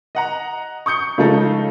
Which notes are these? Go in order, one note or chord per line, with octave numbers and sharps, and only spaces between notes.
D#5 F#5 A#5
C#6 D#6 G6 C#7
C#3 F3 G#3 A3 D#4 A4